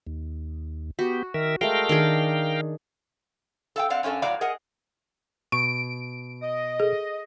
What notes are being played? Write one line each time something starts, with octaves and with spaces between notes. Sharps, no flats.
D#2
B3 F#4 G4
D#3 A#4 E5
G#3 A3 A#4 F5 G5
D#3 D4 G#4
A4 F5 G5
C4 D5 F5 F#5
F#2 C#4 D4 A4 F5
A2 F#3 D5 F5 A#5
G#4 A#4 D#5 F#5
B2 C#6 D7
D#5
G#4 A4